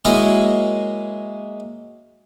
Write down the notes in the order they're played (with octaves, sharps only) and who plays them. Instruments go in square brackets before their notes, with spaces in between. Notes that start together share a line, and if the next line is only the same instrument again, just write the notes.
[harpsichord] F#3 G#3 A#3 E4 G#4 D#5